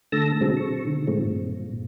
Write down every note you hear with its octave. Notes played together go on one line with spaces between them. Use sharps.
D3 A3 A5 E6 A#6
B2 D3 F#3 G#3 C4
C#6
B2 D3 D#3
A2 D#3 F3 G#3 A3 C4
G2 A#2